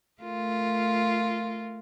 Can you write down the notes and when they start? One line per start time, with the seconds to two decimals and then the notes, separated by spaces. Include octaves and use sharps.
0.22 A3 F4 A#4